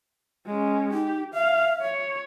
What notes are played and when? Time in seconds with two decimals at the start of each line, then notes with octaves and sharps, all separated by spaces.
0.46 G#3 C#4
0.93 D#4 G4
1.34 E5 F5
1.81 C#5